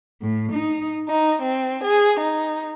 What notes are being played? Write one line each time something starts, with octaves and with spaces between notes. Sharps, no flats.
A2
D#4
D#4
C4
G#4
D#4